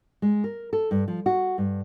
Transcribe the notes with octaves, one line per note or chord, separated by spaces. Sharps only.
G#3
A#4
A4
G2
F3
F#4
G2